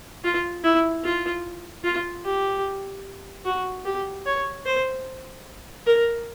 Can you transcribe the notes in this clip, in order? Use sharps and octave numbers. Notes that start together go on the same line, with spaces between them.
F4
E4
F4
F4
G4
F#4
G4
C#5
C5
A#4